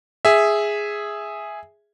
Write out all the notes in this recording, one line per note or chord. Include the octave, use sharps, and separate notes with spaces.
G#4 E5